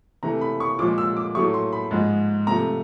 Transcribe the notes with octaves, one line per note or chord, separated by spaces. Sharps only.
C3 E3 A3 A#5
B5
C#6
A#2 F3 G#3 D6
E6
D6
A2 F#3 A3 C#6
C6
B5
G#2 F3 G#3
C3 F3 A3 A#5